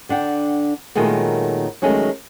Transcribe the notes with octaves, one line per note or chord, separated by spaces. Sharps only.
D3 D4 F#5 G5
A#2 D#3 F#3 G#3 A3 B3
D#3 F#3 G#3 A3 C#4 D#4